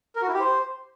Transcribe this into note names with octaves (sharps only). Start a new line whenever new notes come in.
A#4
F#4
E4
G4
C5